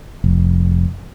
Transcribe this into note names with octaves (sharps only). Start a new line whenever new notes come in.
F1